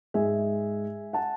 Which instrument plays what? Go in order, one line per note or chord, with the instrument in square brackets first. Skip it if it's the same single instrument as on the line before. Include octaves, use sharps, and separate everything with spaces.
[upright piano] G#2 G#3 E5 G#5
F#5 A5